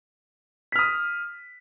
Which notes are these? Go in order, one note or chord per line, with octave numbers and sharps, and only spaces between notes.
D#6 F6 B6